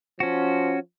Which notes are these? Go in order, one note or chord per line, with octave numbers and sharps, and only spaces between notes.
F3 C#4 F#4